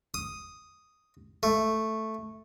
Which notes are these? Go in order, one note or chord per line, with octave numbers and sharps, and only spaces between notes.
D#6
A3